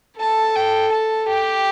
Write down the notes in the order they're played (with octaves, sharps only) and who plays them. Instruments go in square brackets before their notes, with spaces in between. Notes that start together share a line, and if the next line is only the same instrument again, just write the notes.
[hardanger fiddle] A4 [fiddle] A5
[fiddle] G5
A5
[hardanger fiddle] G4 [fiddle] G5